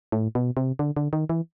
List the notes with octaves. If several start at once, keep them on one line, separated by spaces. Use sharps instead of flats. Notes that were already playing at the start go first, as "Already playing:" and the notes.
A2
B2
C3
D3
D3
D#3
E3